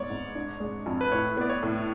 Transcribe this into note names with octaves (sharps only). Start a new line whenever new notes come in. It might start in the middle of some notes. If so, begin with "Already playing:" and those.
Already playing: G#2 B3 C#5 D5
G#2
D4
G#3
F2
B4
A2 C#5
B3 D5
C#5
A2